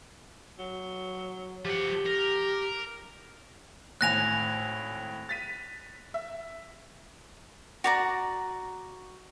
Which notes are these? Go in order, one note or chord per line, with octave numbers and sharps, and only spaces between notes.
F#3
F3 G4 F#5
A#4
G#1 A2 G#5 F#6 A#6 F7
A6 B6 D#7
E5
F#4 D5 A#5